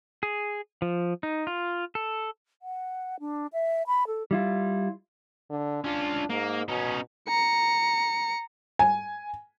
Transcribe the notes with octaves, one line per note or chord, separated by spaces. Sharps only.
G#4
F3
D#4
F4
A4
F#5
D4
E5
B5
A4
G3 E4 F4
D3
C#4 D4 F4
G#2 A#3
B2 C#4 D#4
A#5 C#7
G#5